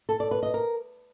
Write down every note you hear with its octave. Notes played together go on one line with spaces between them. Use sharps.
A4
D5
B4
D#5
A#4